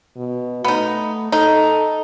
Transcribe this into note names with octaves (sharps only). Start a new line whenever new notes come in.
B2
A3 B3 D#4
D#4 A4